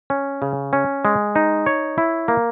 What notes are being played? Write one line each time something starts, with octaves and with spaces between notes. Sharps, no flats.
C#4
C#3
C#4
G#3
D#4
C#5
E4
A#3